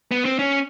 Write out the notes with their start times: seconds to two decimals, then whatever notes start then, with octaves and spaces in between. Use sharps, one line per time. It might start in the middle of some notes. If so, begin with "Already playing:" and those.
0.11 B3
0.25 C4
0.39 C#4